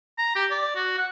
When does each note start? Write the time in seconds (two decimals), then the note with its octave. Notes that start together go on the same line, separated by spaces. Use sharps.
0.18 A#5
0.36 G4
0.51 D5
0.76 F#4
0.98 F#5